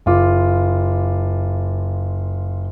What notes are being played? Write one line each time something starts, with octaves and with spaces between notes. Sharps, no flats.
F#1 F4 D6